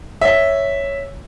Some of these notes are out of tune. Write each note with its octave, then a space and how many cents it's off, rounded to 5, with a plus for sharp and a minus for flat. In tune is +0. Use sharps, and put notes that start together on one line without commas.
C#5 +0 E5 -5